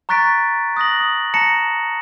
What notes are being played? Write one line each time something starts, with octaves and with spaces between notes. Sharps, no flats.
A#5 C#6 F#6 A6 B6 D7
D#6 F#6 A#6 F#7
D#6
A5 A#5 A#6 C#7 E7